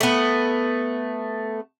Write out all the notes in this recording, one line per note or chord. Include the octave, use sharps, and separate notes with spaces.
A3 B3